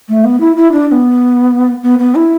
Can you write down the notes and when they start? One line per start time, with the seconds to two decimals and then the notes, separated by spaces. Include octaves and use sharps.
0.09 A3
0.24 B3
0.40 E4
0.56 E4
0.72 D4
0.87 D4
0.91 B3
1.83 B3
1.99 B3
2.15 E4